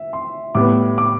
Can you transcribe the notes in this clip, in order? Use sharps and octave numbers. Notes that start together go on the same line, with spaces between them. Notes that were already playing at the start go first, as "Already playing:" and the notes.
Already playing: E5
C6
A2 G3 B3 D6
D6